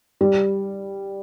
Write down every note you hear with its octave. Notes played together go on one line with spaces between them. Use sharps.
G3